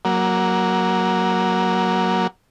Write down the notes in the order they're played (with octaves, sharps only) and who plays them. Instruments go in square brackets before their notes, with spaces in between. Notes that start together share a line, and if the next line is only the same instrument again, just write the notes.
[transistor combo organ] F#3 A#3